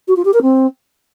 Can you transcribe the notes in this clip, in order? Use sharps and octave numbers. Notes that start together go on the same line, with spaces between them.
F#4
F4
G4
A#4
C4